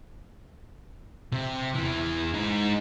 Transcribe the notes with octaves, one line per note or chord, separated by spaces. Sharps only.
C3
E2 E3
G#3 D#4